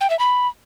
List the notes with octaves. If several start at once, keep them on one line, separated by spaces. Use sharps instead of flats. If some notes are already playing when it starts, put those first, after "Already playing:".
G5
E5
B5